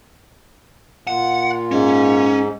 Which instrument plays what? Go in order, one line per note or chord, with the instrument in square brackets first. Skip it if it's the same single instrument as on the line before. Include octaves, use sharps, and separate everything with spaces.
[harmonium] A#2 A#3 F4 [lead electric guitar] F#5
[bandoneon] G#2 [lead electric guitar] C#4